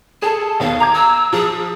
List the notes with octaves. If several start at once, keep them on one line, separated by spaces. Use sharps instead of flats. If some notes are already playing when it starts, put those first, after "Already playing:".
G#4 A4 A5
D#2 B3 F5
A#5 D6 G#6
E6
F3 G#4